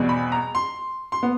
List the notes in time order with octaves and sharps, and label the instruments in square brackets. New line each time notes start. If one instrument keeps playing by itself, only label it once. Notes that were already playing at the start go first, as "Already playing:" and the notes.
Already playing: [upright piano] E2 B2 G3 C4
B5
A#5
C6
C6
B3